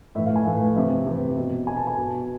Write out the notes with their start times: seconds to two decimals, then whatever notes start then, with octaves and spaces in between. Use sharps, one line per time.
0.15 A2 E3 E5
0.26 F5
0.36 G#5
0.46 A2 E3
0.76 C3 E3 E5
1.06 C3 E3
1.37 B2
1.67 B2 G#5
1.77 A5
1.87 G#5
1.97 B2